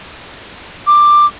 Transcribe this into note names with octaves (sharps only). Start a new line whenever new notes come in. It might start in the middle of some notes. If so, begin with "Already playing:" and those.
D6